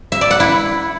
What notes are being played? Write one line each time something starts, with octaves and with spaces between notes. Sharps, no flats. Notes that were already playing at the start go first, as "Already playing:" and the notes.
E5
D5
F#5
E4